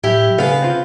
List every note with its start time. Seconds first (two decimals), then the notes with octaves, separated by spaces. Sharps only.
0.04 A2 F#3 E4 G4
0.39 C#3 A3 B3 D4 G#4 F5 B5
0.62 C4 F4